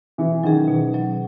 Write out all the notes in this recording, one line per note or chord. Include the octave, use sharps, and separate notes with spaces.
B2 E3
D#3 F#3 C#4 G#4
B2
F#3 C#4 G#4